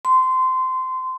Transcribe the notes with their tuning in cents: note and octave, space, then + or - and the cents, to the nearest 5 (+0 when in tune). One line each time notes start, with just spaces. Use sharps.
C6 -20